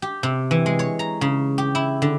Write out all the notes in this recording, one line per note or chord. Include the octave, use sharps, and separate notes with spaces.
G4
C3
E3
G#3
C#5
A#5
C#3
G4
E4
D3